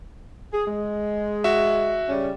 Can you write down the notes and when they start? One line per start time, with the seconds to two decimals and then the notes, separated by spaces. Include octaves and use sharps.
0.54 G#4
0.68 G#3
1.44 F#4 E5
2.09 C#3 G3 C#4